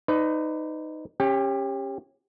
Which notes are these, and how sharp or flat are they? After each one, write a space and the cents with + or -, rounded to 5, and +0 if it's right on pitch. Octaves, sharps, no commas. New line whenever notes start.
D#4 +0 B4 +30 D5 -5
C#4 -20 G4 +20